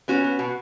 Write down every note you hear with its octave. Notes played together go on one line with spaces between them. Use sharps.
B3 C#4 F#4
B3
B2